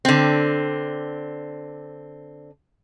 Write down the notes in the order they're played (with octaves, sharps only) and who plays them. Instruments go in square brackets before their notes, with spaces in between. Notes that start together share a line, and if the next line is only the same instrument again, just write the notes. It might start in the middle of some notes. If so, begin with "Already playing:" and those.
[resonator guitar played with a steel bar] D3 C4